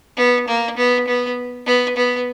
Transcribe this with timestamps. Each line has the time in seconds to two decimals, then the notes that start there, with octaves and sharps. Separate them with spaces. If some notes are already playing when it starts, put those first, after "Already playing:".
0.17 B3
0.48 A#3
0.77 B3
1.08 B3
1.66 B3
1.97 B3